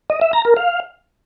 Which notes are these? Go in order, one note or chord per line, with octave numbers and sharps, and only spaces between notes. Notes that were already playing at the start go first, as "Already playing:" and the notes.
D#5
E5
A#5
A#4
F5